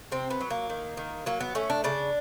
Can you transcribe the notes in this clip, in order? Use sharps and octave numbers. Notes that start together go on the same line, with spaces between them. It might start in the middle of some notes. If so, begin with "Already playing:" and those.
C3 C4
B3
F#3
A#3
D#3
D#3
F#3 A#3
B3
A3 C#4
D4
C#3 D4